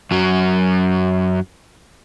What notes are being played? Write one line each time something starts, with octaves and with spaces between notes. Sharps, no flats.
F#2 F#3